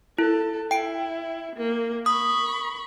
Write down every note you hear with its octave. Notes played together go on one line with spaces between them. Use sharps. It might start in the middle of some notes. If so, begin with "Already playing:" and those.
E4 A4
E4 G5 D7
A#3
B5 C#6 D#6